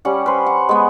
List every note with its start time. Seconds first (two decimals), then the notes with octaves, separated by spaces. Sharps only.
0.05 G3 C#4 G4 F#5
0.26 B4 C5
0.46 F#5
0.69 G#3 B3